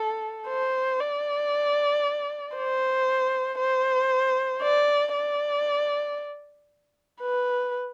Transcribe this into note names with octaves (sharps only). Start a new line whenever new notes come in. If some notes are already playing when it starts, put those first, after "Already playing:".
Already playing: A4
C5
D5
C5
C5
D5
D5
B4